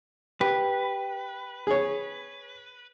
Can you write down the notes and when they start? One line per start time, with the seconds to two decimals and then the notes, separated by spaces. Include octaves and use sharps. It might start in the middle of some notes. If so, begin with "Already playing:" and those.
0.41 G4 B4
1.67 G#4 C#5